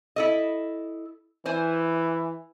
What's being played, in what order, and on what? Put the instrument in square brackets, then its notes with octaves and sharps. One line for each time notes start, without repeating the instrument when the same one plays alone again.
[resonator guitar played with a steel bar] E4 A4 D#5
[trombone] E3 [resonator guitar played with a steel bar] C5 G#5